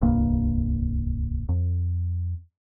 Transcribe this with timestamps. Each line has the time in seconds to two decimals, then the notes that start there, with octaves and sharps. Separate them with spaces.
0.02 D1 C2 G2 A#3
1.49 F2